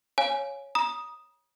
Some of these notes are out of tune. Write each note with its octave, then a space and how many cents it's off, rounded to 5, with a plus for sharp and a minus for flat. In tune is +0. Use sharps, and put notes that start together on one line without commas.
C#5 +0 F5 +0 G#5 +5
A#5 +40 D#6 +0